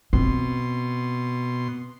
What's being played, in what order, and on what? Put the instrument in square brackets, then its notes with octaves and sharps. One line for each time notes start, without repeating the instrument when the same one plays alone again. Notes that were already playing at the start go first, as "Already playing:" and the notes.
[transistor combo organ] B2 C6 [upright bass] C4